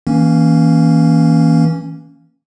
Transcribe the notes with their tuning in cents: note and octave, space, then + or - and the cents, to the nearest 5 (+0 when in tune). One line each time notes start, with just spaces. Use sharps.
E3 -25 A#3 +0 C#4 +0